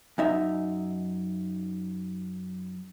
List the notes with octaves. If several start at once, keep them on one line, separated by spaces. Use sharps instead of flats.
F#2 D#4 E5